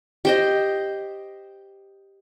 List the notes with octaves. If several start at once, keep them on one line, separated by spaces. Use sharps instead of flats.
G4 C5 D#5